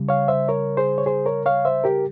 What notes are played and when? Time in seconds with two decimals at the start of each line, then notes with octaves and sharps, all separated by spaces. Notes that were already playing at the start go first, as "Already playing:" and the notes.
Already playing: C#3 G3
0.09 C#5 F5
0.28 C5 E5
0.48 A#4 C#5
0.77 G#4 C5
0.98 C#5
1.06 G#4 C5
1.26 A#4 C#5
1.46 C#5 F5
1.65 C5 E5
1.84 G4 A#4